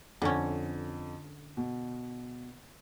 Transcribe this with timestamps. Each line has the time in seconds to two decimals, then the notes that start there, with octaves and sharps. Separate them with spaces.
0.22 F2 D3 C#4
1.57 B2